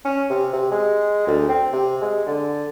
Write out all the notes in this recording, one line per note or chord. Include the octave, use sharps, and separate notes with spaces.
C#4
C3
C3
G#3
D2
C4
C3
G#3
D3